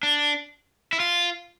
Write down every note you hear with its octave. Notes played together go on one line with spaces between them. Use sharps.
D4
E4
F4